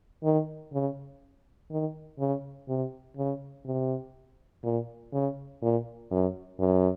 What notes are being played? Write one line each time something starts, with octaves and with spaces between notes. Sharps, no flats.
D#3
C#3
D#3
C#3
C3
C#3
C3
A#2
C#3
A#2
F#2
F#2